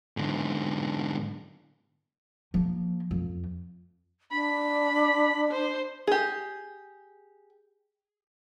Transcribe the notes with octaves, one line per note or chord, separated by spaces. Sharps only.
G#2 D3
F3 A#3
F2
D4 B5
C5
G4 G#4